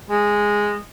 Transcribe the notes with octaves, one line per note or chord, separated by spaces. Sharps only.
G#3